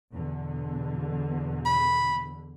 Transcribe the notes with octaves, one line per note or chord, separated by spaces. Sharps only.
E2 B2 D3
B5